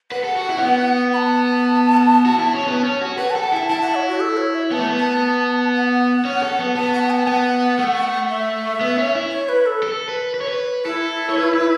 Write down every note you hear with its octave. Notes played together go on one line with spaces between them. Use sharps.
B4 F#5
A4
F#4
E4
C#4
B3
B5
A5
F#4
E4
C#4
B3
C#4
F#4
B4 F#5
A4 A5
F#5
E4 A5
E4 A5
F#5
C#5
F#4
A4
C#5
E5
B3 A5
A3
B3
A5
F#5
C#4
A4
B3
B3 A5
F#5
A5
B3 F#5
A3
E5
B3
C#4
E4
C#5
B4
A4
A4
B4
B4
C#5
B4
E4 A4
C#5
B4
B4